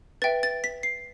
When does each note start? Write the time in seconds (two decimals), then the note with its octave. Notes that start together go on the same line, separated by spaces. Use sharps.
0.22 B4 E5 G5 A6
0.43 A6
0.64 B6
0.83 C7